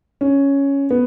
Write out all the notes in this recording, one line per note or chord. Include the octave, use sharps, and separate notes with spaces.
C#4
B3